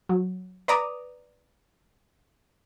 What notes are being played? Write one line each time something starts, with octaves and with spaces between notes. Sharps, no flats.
F#3
B4 D5 A#5 D6 D#6